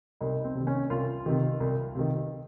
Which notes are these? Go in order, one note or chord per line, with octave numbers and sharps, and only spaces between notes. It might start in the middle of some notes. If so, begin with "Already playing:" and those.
C2 D#4
C4
C3 D#3
C#4
C2 F4
C3 D#3
C2
C3 D#3